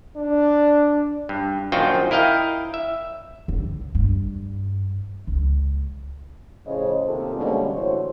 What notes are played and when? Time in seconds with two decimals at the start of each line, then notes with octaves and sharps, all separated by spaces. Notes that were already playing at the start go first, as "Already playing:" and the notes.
0.16 D4
1.29 G2
1.72 A#1 F#2 D#3 F4 F#4 G5
2.11 E4 A#4 D#5 F5 G5
2.74 E5
3.48 C#2
3.95 G2
5.27 C#2
6.66 A2 C#3 F3 C5 C#5 D#5
7.06 C3 D#3 A#3 F4 A4
7.36 B2 D3 G3 G#3 A#3 C#4
7.72 A2 D3 E3 F#4 C5 C#5